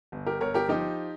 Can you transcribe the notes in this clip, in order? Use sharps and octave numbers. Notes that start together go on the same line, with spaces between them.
G1
G4 A#4
G1 A#4 C#5
G4 A#4
F3 D#4 G4